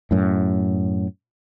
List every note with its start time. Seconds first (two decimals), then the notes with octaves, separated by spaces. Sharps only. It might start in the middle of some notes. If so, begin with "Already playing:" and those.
0.11 F#2 A2